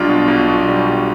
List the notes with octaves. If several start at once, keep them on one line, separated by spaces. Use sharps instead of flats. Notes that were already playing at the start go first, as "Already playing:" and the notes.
Already playing: B1 G3 D4 F4
B2
B1
B2
G3
G3